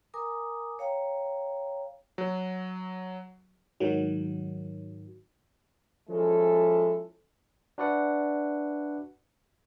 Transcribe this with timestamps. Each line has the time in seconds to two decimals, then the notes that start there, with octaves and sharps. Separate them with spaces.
0.14 A#4 G#5 A#5 D6 D#6
0.79 C#5 F5 G5 A#5
2.18 F#3
3.80 G#2 D#3 F#3
6.09 F3 G#3 C#4 E4 A4
7.78 D4 F#4 B4 D5 E5 F#5